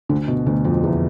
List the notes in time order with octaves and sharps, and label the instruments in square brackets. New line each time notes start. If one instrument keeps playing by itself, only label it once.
[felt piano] D2 D3
B2
D2 D3
F2 F3
E2 E3